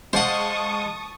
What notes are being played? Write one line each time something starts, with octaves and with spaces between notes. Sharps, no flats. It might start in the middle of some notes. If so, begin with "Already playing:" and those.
G#3 C5 F5 F#5 A5 C#6 D#6